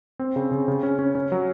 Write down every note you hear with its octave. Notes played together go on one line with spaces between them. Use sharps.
C4
C#3
C#3
C#3
C#4
C#4
C#4
F#3